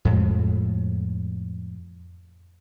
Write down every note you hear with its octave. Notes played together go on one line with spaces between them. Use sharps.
F2 A2 G#3